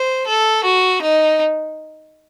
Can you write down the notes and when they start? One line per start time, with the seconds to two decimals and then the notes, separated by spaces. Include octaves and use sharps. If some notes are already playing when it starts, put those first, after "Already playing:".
Already playing: C5
0.27 A4
0.64 F#4
1.02 D#4